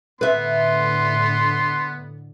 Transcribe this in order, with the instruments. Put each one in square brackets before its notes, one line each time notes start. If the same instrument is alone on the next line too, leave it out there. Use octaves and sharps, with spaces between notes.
[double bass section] A2 D3 [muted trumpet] B3 [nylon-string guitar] B4 E5 [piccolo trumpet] C6